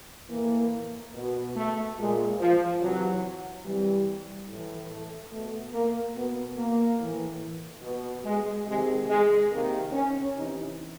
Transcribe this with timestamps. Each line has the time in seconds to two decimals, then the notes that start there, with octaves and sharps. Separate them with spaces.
0.30 A2 E3 A#3
1.14 B2
1.56 A3
1.97 A#2 G#3
2.39 F3
2.81 C3 E3 F#3
3.65 C3 E3 G3
4.48 A2 E3
4.91 A3
5.32 B2 A3
5.73 A#3
6.15 B2 B3
6.57 A#3
7.00 A2 E3
7.82 B2
8.25 G#3
8.66 C3 D#3 G#3
9.09 G#3
9.50 C3 D#3 A#3
9.92 C#4
10.34 C3 E3 D#4